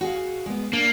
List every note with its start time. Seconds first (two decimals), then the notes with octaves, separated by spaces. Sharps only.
0.01 F#4 G#4 F5
0.46 G#3 B3
0.73 A#3 D4